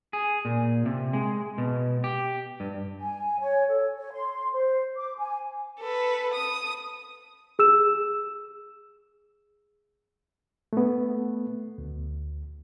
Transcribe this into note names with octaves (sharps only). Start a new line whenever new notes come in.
G#4
A#2
C3
G#3
B2
G4
G2
G#5
C#5
A4
C#5
C6
C5
D6
G#5
A4 B4
D#6
G#4 E6 E7
A3 B3
D2